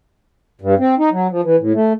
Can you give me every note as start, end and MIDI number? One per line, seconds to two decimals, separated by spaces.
0.61 0.75 43
0.79 0.95 60
0.99 1.10 63
1.12 1.27 54
1.31 1.41 53
1.43 1.56 52
1.59 1.73 45
1.74 1.93 57